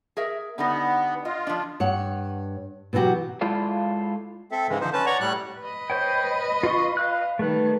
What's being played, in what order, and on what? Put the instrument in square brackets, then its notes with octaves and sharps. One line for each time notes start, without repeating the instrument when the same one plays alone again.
[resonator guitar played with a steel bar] G#4 A#4 E5
[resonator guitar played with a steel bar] D3 G3 D#4 [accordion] B3
[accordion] F4 [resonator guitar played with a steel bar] D#5
[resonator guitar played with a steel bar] F3 D4
[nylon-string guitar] G2 C#5 F#5
B2 E3 F#3 F#4 G4
[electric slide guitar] G#3 E4 F4 A4 D5 F5
[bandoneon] C4 A4 E5
G#2 C#3 E3 G#3
D3 F3 D#4 C5
C#4 B4 A5
C#5 D5 F#5 A#5 C#6
A2 G3 F#6
[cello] B4 D#5
[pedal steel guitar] C5 C#5 G5
F4 C6 C#6
F5 F#6
[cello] D#3 G3 [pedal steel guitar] A3 B4